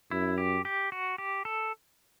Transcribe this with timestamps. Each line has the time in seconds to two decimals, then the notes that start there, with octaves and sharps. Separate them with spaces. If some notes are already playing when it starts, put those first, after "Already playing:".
0.11 F#2 E4
0.38 G4
0.65 G4
0.92 F#4
1.18 G4
1.45 A4